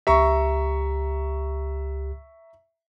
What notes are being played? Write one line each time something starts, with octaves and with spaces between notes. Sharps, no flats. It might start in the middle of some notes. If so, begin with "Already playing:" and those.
C#2 G4 E5 A#5 C#6